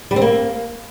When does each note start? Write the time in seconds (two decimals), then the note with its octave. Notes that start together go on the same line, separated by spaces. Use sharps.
0.11 G3
0.16 C4
0.22 A#3